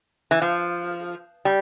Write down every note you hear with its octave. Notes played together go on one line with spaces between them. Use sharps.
E3
F3
G3